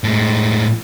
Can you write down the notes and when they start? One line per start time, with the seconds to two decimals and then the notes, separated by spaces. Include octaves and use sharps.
0.04 A2 G#3